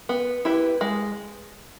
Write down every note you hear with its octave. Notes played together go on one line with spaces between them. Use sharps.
B3
E4 G4 B4
G#3